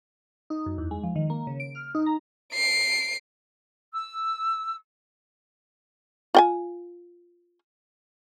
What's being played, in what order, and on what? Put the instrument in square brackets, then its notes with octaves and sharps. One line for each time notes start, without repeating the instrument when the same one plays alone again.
[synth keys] D#4
F#2
E2
G#3
F3
D#3
A#3
C#3
D7
F6
D#4
A#5
[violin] C7 D7
[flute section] E6
[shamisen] F4 G5 G#5